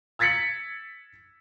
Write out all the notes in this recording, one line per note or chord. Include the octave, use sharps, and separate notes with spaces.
E6 G#6 A6 B6 C#7 F#7